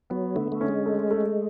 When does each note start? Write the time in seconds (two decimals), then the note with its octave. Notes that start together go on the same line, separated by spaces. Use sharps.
0.10 F#3 B3
0.35 D3 A3
0.52 A3
0.61 C#4
0.68 G#3
0.86 A3
1.11 A3